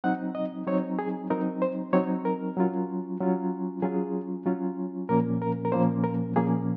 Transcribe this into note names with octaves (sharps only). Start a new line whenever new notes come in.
F#3 C4 D#4 F#5
D#5
F#3 C4 D#4 C#5
G#4
F#3 C4 D#4 A#4
C5
F#3 C4 D#4 C#5
A#4
F#3 C#4 F4
F#3 C#4 F4
F#3 C#4 F4 G#4
F#3 C#4 F4
A#2 F3 A#3 C#4 A#4
A#4
A#4
A#2 F3 A#3 C#4 C5
A#4
A#2 F3 A#3 C#4 G#4